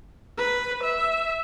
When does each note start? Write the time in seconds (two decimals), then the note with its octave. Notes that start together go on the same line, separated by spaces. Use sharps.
0.38 B4
0.83 E5